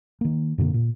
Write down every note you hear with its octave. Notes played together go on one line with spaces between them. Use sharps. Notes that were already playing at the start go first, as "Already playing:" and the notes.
D#3 A#3
F#2 B2 D3 A#3
A#2